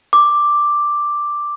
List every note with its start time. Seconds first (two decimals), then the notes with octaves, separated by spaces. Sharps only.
0.13 D6